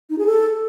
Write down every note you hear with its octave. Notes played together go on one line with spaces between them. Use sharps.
D#4
G#4
A4